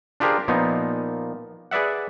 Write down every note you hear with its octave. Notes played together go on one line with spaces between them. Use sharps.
D4 F4 G4 G#4 A#4 C5
A#2 F3 A#3 B3 D#4
G#4 B4 D5 E5 F#5